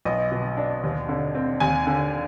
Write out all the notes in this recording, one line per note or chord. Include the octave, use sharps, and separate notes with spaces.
B1 D#5
B2
D4
D#2
D3
C4
D#2 G#5
D3